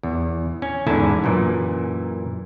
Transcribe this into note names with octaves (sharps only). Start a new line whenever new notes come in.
E2
C#4
E2 G#2 D3 E4 G#5 A5
F#2 A#2 E3